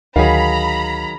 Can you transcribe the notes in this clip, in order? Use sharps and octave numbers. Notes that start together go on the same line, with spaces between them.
D2 D#3 F#3 G#4 F5 A#5 B5